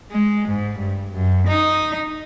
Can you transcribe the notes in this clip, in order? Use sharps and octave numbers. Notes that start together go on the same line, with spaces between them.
G#3
G#2
G2
F#2
D#4